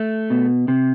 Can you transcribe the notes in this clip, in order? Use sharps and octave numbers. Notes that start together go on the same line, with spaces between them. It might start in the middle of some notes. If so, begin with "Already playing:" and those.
Already playing: A3
B2
C3